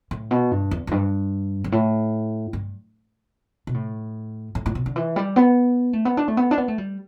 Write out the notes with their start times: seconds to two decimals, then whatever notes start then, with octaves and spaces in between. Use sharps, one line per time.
0.11 A2
0.31 B2
0.51 G2
0.71 E2
0.87 E2
0.91 G2
1.64 G2
1.72 A2
2.53 G2
3.67 B2
3.74 A2
4.55 A2
4.66 A2
4.75 B2
4.86 D3
4.96 E3
5.16 G3
5.36 B3
5.93 A3
6.05 B3
6.17 D4
6.28 A3
6.37 B3
6.51 D4
6.58 B3
6.68 A3
6.78 G3